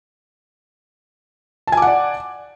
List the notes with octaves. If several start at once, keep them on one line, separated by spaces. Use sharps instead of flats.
D5 F#5 G#5 A5 D6